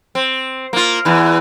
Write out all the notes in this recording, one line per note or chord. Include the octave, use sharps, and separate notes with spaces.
C4
A#3 F4
E2 E3